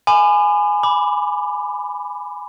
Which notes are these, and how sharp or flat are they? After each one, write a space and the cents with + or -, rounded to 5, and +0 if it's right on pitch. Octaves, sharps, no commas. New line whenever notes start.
G#5 +0 B5 +35 D6 +40
B5 +0 D6 +10